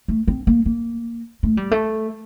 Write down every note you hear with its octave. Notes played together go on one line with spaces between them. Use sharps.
A3
C4
A#3
A#3
A3
G3
A3